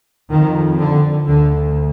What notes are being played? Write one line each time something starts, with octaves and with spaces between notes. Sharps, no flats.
F2 D#3
D3
D2 D3